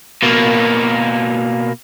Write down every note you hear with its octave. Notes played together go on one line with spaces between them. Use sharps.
B2 A#3